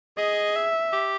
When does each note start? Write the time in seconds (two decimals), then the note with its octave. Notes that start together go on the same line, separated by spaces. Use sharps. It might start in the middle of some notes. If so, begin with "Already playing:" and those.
0.17 G#4 D#5
0.55 E5
0.93 G4